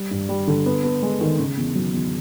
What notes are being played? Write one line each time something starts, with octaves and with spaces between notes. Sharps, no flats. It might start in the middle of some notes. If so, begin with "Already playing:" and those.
Already playing: G3
G2
G3
D3
B3
B3
G#3
D#3
C#3
E2
F#3
E2